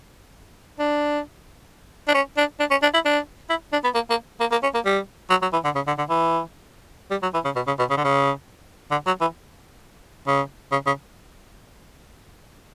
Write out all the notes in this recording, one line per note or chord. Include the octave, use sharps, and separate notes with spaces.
D4
D4
C#4
D4
D4
C#4
D4
E4
D4
E4
D4
B3
A#3
A#3
A#3
A#3
C#4
A#3
G3
F#3
F#3
E3
D3
C#3
D3
D3
E3
G3
F#3
E3
C#3
B2
C#3
B2
C#3
D3
C#3
D3
F#3
E3
C#3
C#3
C#3